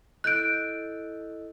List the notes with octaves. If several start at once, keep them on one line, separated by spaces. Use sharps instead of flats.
E4 A4 D#5 F#6 G6 D7